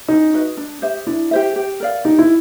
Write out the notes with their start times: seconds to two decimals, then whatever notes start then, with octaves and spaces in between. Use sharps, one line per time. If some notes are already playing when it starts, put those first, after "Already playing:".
0.08 C#4 D#4
0.33 F#4 B4 D#5
0.57 D4
0.82 G4 C5 E5
1.07 D4 E4
1.31 G4 C5 E5
1.56 G4
1.80 A#4 D5 F5
2.05 D#4 G4
2.19 E4